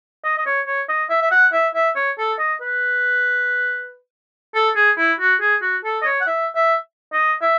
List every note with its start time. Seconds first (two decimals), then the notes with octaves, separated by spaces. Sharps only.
0.24 D#5
0.38 D#5
0.46 C#5
0.67 C#5
0.89 D#5
1.10 E5
1.22 E5
1.31 F#5
1.53 E5
1.75 E5
1.96 C#5
2.18 A4
2.39 D#5
2.61 B4
4.55 A4
4.76 G#4
4.98 E4
5.20 F#4
5.41 G#4
5.62 F#4
5.84 A4
6.02 D#5
6.05 C#5
6.21 F#5
6.27 E5
6.56 E5
7.13 D#5
7.42 E5